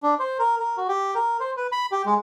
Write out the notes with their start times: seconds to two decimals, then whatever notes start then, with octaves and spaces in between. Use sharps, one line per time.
0.03 D4
0.19 C5
0.39 A#4
0.60 A#4
0.77 F#4
0.88 G4
1.15 A#4
1.40 C5
1.57 B4
1.72 B5
1.92 G4
2.06 G#3